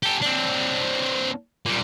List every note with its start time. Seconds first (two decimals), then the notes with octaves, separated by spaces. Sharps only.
0.03 G4 A4
0.22 C4 D4
1.66 A#2 G3